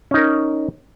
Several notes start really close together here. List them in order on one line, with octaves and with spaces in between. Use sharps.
C#4 D#4 A#4